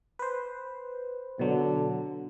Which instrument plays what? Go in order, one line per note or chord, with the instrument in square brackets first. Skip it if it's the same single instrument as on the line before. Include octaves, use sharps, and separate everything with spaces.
[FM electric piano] B4 C5
[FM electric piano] B2 F#3 [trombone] D3